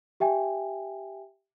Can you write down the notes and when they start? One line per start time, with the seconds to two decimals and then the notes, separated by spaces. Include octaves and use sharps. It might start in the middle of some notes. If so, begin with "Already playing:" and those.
0.20 G4 E5 G5 G#5